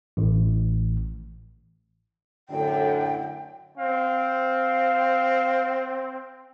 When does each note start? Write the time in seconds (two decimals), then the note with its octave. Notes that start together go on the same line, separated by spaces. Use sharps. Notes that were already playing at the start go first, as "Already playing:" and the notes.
0.17 A1
2.49 F#2 A2 D3 G5
3.77 C4 F5